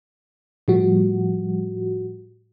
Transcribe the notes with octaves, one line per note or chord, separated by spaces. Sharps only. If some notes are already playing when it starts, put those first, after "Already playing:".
A2 F3 G3 F#4